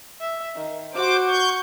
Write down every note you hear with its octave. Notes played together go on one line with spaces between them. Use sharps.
E5
D#3
F#4 C5 D6
C#6 G6